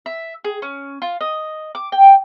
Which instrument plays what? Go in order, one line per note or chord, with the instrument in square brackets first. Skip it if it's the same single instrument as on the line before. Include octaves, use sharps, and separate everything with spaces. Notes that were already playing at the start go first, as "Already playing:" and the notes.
[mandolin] E5
G#4
C#4
F4
D#5
D6
G5